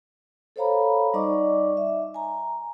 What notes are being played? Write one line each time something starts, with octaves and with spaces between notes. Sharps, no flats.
A4 C5 C#5 F5 A#5 B5
G3 D#4 D5 D#5 C#6 D6
E5
G#5 A#5